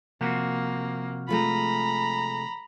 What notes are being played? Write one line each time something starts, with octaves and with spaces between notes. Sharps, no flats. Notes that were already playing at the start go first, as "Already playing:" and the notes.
C3 F3 A#3 F#4
G#3 A3 F4 A#5 B5